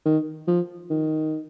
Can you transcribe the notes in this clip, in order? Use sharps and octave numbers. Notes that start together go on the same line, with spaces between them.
D#3
F3
D#3